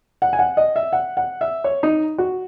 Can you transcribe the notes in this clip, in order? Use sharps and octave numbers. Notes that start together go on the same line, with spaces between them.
F#5
G#5
F#5
D#5
E5
F#5
F#5
E5
C#5
D#4
F#4